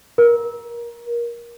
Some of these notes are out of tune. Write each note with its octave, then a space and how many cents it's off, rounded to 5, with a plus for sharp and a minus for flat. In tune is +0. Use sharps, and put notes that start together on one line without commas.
A#4 +20